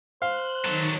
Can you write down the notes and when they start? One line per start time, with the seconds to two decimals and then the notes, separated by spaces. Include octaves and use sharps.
0.22 C5 F5 F#6
0.65 D#3 F#3 D#4 A4